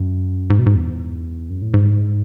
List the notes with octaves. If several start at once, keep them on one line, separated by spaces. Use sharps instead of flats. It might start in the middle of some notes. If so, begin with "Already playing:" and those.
Already playing: F#2
G#2
B2
G#2
E2
F#2
A2
G#2